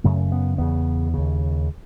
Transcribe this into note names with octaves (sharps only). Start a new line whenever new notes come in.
F#2 C#3 A3
B3
E2 C#3 B3
D#2 C#3